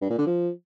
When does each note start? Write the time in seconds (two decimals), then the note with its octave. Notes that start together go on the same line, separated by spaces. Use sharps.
0.01 G2
0.10 A#2
0.18 D3
0.27 F3